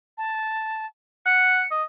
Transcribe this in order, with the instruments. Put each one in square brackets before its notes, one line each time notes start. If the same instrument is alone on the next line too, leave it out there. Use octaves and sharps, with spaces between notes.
[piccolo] A5
[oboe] F#5 [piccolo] C#7
[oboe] D#5